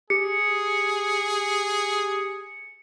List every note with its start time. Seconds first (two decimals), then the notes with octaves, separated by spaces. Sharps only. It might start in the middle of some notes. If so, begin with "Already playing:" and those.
0.10 G4 G#4 C#7